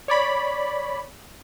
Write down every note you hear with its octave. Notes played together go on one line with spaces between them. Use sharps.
C#5 D5 B5